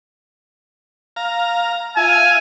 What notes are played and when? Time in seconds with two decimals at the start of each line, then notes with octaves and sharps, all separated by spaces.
1.16 F5 A#5
1.97 F4 E5 G#5